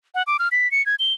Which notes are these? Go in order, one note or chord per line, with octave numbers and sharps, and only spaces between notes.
F#5
D6
F6
B6
C#7
G#6
G7